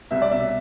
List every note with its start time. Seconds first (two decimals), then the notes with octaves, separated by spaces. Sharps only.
0.11 C2 E5
0.22 D5
0.31 B2 E5